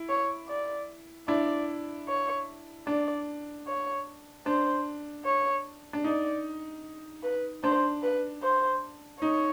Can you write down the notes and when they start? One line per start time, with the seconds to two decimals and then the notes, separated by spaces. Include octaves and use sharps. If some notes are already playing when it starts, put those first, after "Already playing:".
Already playing: E4
0.09 C#5
0.48 D5
1.28 D4 E4 D5
2.08 C#5
2.87 D4 D5
3.67 C#5
4.46 D4 C5
5.25 C#5
5.93 D4
6.04 D#4 D5
7.23 B4
7.63 D4 C5
8.02 B4
8.43 C5
9.21 D#4 C#5